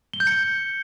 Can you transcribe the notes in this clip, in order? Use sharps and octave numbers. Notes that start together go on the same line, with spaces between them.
G7
G6
C#7